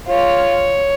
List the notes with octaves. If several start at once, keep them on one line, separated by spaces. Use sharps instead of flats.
F4 C#5